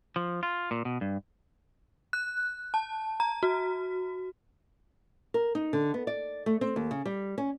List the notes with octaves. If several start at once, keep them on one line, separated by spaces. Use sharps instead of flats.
F3
F4
A#2
B2
G2
F#6
A5
A#5
F#4
A#4
D#4
D3
B3
D5
A3
C4
D#2
C#3
G3
C#4